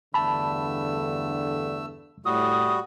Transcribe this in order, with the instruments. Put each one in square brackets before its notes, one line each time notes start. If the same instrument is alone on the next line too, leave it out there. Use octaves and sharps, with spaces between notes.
[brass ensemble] E2 G2 D3 [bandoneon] A3 E6 [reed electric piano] A5 B5
[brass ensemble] A2 [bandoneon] G3 F#4 [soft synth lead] D#6